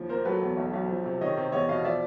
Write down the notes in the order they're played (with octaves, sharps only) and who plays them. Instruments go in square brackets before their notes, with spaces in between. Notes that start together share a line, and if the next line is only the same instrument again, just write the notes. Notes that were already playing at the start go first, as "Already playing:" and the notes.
Already playing: [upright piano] D#2 F3
A#2 A#4 C5
F#3 A4 B4
E2
B1
B1
F3
C3
D#3 C#5 D#5
C3
E2 C#5 D#5
B2 D#5 F5
F3 D5 E5